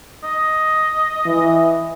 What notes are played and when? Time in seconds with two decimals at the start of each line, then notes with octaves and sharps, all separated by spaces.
0.23 D#5
1.26 E3